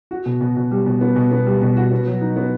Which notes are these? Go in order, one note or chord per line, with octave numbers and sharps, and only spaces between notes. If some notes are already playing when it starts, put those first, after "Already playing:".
F#4
B2
B2
B2
G3
B2
B3
B2
B3
G3
B2
F#4
B3
F#3
D#4
B3